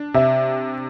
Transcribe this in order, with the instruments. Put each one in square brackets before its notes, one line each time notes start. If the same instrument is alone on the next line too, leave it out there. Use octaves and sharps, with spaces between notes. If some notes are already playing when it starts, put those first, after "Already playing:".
Already playing: [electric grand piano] D4
[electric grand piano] C3 [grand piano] E5